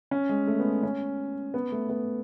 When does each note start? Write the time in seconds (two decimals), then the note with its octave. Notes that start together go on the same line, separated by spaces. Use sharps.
0.11 C#4
0.29 G#3
0.47 A3
0.59 B3
0.83 C#4
1.54 B3
1.72 A3
1.89 B3